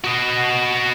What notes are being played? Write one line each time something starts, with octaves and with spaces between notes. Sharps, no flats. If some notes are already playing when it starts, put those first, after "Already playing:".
F#4 D#5